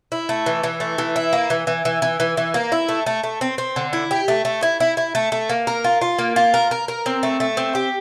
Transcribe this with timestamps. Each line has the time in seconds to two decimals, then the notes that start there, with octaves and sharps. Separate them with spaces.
0.12 E4
0.29 A3
0.46 E3
0.63 E3
0.80 A3
0.98 E3
1.16 E4
1.33 A#3
1.50 E3
1.67 E3
1.85 E3
2.02 E3
2.20 E3
2.37 E3
2.54 A#3
2.72 E4
2.89 A3
3.06 A3
3.24 A3
3.41 C4
3.58 C4
3.76 D3
3.93 E4
4.11 G4
4.28 A3
4.45 A3
4.63 E4
4.80 E4
4.97 E4
5.15 A3
5.32 A3
5.50 A#3
5.67 A#4
5.84 F4
6.01 F4
6.19 A#3
6.36 F4
6.54 A#4
6.71 A#4
6.88 A#4
7.06 C4
7.23 A3
7.40 A3
7.57 C4
7.75 G4